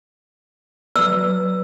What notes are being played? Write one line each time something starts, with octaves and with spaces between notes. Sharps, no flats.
F#3 B4 D5 E6